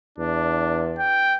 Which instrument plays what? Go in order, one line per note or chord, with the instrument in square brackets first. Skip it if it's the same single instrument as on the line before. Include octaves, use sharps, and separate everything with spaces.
[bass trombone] E2 [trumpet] D4
[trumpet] G5